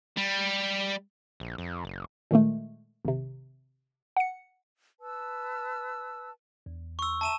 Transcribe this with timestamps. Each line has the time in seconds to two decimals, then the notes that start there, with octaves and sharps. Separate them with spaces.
0.17 G3
1.40 A#1
1.58 F2
1.85 F#1
2.31 A#2 D#3 G#3 A3
3.05 G#1 C3
4.17 F#5 C#7
5.00 B4 A5 E6
6.66 E2
6.99 C6 C#6 E6
7.21 E5 A5 A#5 D#7 E7